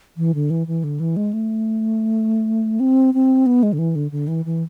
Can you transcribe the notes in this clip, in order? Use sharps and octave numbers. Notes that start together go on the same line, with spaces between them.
E3
D3
E3
E3
D3
E3
G#3
A3
C4
C4
B3
G#3
D3
E3
D3
D3
E3
E3